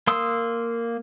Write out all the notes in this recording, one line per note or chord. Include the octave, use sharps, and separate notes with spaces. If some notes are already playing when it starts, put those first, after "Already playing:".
A#3 C6 D#6 E6